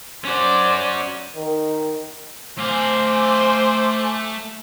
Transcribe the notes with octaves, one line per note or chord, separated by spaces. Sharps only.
C#4 F#4 C5 D5
D#3
A3 C5 F5 G#5 D6